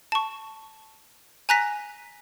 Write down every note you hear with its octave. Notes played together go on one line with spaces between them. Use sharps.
A5 C#6
G#5 A#5 F#6 A#6 B6